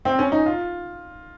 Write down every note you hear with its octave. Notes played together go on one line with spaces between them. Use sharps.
C4
C#4
D#4
F4